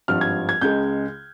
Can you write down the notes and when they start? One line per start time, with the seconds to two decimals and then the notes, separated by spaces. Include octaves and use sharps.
0.08 G#1 G2 F3 F6
0.21 G#6
0.49 G#6
0.61 C#2 C#3 G#3 G6